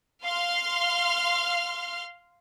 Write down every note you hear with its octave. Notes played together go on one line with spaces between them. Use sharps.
F5 C6 F6